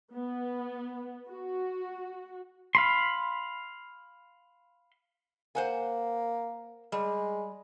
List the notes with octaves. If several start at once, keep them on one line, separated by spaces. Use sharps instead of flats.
B3
F#4
F5 B5 C6
A#3 C5 F#5 G#5
G3 G#3